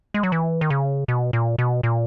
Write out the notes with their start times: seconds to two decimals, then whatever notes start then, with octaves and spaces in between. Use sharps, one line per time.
0.14 G#3
0.23 F#3
0.32 E3
0.61 D#3
0.70 C#3
1.08 B2
1.33 A#2
1.58 B2
1.83 A#2